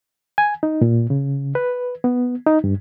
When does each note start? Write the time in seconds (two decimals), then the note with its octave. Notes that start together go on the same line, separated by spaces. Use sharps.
0.38 G#5
0.63 D#4
0.81 A#2
1.10 C#3
1.55 B4
2.04 B3
2.47 D#4
2.64 G2